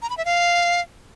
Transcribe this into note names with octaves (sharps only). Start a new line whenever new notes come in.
A#5
B5
E5
F5